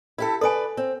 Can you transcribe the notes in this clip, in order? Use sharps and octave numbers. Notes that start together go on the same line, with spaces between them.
E4 G4 A4
A4 B4 D5 G#5
C4